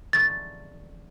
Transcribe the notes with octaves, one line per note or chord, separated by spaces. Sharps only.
A6